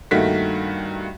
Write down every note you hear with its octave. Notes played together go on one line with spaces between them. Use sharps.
G2 D#3 A3 A#3 F#4 B6